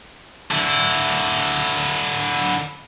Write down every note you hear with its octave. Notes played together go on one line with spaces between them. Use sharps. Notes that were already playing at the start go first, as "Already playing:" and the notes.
D3 E4